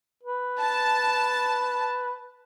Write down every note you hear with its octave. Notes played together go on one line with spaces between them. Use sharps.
B4
A5